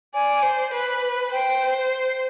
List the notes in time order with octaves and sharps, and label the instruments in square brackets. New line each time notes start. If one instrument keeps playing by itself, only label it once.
[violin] D5 [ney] G#5
[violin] C5
B4
[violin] C5 [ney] G5